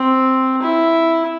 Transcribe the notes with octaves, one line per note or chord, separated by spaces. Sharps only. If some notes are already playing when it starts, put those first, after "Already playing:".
Already playing: C4
E4